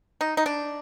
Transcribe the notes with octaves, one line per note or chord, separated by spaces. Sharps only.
D#4
D#4
D4